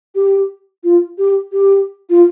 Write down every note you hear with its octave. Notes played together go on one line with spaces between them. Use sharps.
G4
F4
G4
G4
F4